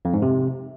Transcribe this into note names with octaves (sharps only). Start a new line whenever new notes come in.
F2
G#2
C3